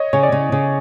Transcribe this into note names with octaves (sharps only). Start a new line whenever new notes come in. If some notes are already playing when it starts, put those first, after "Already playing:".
Already playing: C#5 D#5
C#3 C#5
D5
C#3
C#3